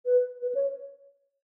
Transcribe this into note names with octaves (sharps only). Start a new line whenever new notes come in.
B4
B4
C#5